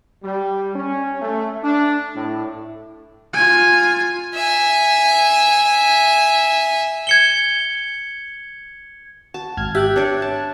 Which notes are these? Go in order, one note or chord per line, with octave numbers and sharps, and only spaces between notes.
G3
C#4
A3
D4
A2
F4 G#5
E5 G#5
G#6 C#7 G7
F#4 A5
G#1 F6 G#6
G4 E5 F#6 G#6
D4 C#5 D5
A5